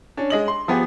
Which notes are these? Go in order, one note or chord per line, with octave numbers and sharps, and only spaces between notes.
C#4 D4
G#3 D#5 F#7
C6
F3 B3 G4 G#4